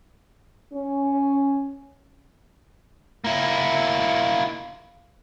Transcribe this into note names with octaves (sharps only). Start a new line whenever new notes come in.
C#4
A#3 E4